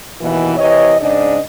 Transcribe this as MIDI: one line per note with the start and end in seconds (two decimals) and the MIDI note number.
0.20 0.56 39
0.20 0.56 47
0.20 0.56 52
0.57 0.95 48
0.57 0.95 52
0.57 0.95 73
0.57 0.95 75
0.99 1.39 44
0.99 1.39 49
0.99 1.39 62
0.99 1.39 74
0.99 1.39 75